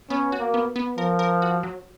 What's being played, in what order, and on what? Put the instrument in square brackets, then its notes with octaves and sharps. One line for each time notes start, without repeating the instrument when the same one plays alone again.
[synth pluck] B3 [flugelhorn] C#4
[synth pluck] F#4
[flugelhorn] A#3
[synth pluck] B3
B3
[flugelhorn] F3 [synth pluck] A#4
[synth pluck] A#4
F#4
F#3